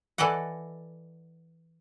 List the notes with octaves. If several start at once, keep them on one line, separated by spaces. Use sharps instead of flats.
E3 A4 D5 D#5 F#5